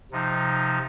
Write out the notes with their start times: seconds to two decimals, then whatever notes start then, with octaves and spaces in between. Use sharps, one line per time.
0.12 C3 F3 D#4